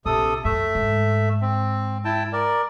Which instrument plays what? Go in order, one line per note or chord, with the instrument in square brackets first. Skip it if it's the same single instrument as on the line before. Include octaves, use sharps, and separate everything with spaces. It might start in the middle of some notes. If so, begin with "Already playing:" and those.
[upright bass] A#1 [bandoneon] C3 A4 D#6
[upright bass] F#2 [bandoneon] A3 E5
[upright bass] G#2
[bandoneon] C4
E4 G5 A5
A#4 D5